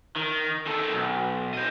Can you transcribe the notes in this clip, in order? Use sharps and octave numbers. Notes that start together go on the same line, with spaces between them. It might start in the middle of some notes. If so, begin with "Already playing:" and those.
D#3
D#3 A4
B1
C5 D#5